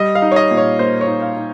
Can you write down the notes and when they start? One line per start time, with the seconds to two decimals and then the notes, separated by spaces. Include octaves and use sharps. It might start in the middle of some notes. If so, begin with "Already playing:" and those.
Already playing: G3 D#5
0.15 F5
0.22 D#4
0.32 C#5
0.36 D#5
0.51 A#2
0.57 C#5
0.79 A#3 C5
1.01 C#5
1.07 D#4
1.22 F5
1.36 D#4